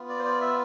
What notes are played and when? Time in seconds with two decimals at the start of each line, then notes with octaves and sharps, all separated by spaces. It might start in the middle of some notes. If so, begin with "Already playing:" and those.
Already playing: B3 F4
0.09 D5
0.19 C5
0.25 D5
0.41 E5